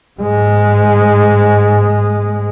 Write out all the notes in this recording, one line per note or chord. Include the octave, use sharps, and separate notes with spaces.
G#2 G#3